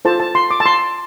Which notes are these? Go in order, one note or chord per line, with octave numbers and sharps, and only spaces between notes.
F4 A4 C5 A5
A5
C6
D6
A5
C6